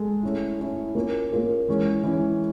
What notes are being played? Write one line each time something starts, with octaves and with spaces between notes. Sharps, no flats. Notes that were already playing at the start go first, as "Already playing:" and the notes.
Already playing: G#3 A4
A3 C#4 E4
A3 C#4 E4
A#3 C#4 F4 A#4
A#3 C#4 F4 A#4
E3 G#3 C#4
E3 G#3 C#4